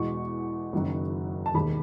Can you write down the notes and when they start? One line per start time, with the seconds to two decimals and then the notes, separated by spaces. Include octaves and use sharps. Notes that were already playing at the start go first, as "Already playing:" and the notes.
Already playing: E2 B2 G#3 C#6
0.72 F#1 F#2 D#3 F#3
1.46 A5
1.54 E1 D#2 D#3 B5